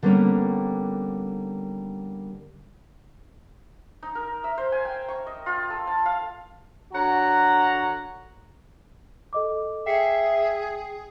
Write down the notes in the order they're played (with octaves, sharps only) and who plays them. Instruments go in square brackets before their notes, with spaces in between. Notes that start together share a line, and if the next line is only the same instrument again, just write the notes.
[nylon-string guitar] D3 G3 A#3 B3 C#4
[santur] D#4
A#4
E5
C5
G#5
G5
C#6
D#5
F4
A4
A5
F5
[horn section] D3 F#4 C#5 F#5 A#5
[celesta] A4 D#5 D6
[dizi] G#4 [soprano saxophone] E5 [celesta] G5 C7 C#7